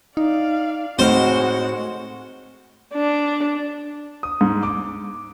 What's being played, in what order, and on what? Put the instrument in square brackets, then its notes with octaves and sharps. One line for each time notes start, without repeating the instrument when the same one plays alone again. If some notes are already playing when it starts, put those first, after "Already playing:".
[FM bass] D#4 [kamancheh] D5 F5
[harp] A2 D#4 F6 [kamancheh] G#3 F#4 [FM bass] C4 [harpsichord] C5
[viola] D4
[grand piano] D#6
G#2
D6